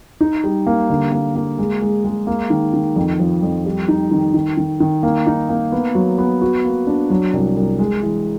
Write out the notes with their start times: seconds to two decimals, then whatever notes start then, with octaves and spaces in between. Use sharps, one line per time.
0.21 D#4
0.44 G3
0.67 A#3
0.90 D3
1.12 A#3
1.36 A#3
1.59 G#3
1.82 G#3
2.05 G#3
2.27 A#3
2.50 D#3
2.74 D#3
2.96 F2
3.20 F3
3.43 F2
3.65 G3
3.88 D#4
4.11 D#3
4.34 D#3
4.57 D#3
4.80 D#3
5.03 A#3
5.27 D#4
5.49 A#3
5.72 B3
5.95 F#3
6.18 B3
6.42 F#4
6.65 A#3
6.87 D4
7.10 F#3
7.33 C2
7.57 C2
7.79 G#3
8.03 E3